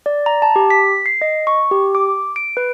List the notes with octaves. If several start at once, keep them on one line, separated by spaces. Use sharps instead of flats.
D5
A#5
A5
G4
B6
C7
D#5
C#6
G4
D6
D7
B4